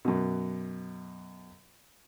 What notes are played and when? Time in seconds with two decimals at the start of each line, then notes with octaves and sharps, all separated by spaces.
0.05 F#2 B2